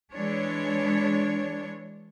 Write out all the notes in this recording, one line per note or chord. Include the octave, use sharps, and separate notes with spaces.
E3 G#3 D4 C#5